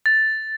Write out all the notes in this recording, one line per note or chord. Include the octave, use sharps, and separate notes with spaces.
A6